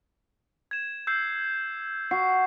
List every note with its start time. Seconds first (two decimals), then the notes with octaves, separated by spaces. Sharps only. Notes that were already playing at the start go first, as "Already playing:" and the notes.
0.71 G#6 E7
1.07 E6 G6 C7
2.11 F#4 C7